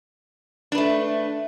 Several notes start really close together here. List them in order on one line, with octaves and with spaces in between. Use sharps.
D4 B4 A3